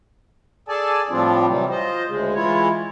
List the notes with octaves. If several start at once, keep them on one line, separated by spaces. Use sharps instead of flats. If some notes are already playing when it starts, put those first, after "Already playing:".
G#4 A4 D5 G#5 A5
A2 F3 G3 C4 D4 F4
C3 E3 F#3 G3
F4 C5 D#5
D2 C#3 G#3
E3 G#3 E4 F4 C#5